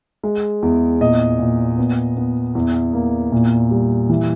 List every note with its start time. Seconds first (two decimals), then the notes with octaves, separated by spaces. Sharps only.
0.23 G#3
0.62 E2
1.00 A#2 D#5
1.39 A#2
1.78 B3
2.17 B3
2.55 E2
2.93 A#3
3.32 A#2
3.71 G3
4.09 E3